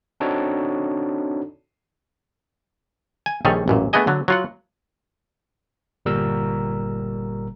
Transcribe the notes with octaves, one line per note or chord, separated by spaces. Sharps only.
C4 D4 D#4 F#4 A4 C#5
G#5
A#1 D#3 G3 G#4 A4 C#5
A1 F#2 A#2
A3 B3 D4 G#4 D#5 G#5
D3 F#3
F#3 F4 F#5
G1 A#2 G3 A#4 A#5 E6